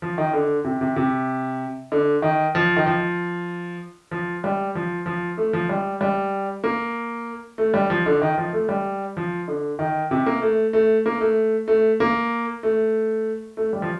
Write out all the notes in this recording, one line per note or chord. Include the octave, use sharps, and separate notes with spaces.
F3
D#3
D3
C3
C3
C3
D3
D#3
F3
D#3
F3
F3
G3
F3
F3
A3
F3
G3
G3
A#3
A3
G3
F3
D3
D#3
F3
A3
G3
F3
D3
D#3
C3
A#3
A3
A3
A#3
A3
A3
A#3
A3
A3
G3
F3